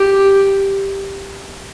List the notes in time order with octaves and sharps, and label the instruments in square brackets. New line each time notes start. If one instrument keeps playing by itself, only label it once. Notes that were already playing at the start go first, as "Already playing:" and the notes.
Already playing: [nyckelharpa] G4